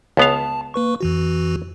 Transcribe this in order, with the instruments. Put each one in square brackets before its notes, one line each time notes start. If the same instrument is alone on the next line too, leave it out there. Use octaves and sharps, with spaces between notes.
[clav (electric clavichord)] C#2 B3 F5 [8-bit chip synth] A5
[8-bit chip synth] A#3 B4 C#6
F2 E3 F#4